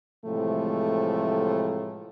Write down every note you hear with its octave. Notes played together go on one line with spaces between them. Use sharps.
A2 C3 E3 F3 G#3 A3